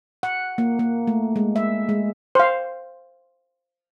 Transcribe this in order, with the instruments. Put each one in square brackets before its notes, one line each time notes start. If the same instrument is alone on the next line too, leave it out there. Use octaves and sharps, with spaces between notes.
[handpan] F#5
A#3
A#3
A3
G#3
E5
G#3
[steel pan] C5 F5